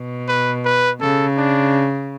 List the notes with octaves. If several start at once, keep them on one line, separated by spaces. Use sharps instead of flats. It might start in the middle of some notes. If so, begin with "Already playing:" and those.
Already playing: B2
B4
B4
C#3 A4
D4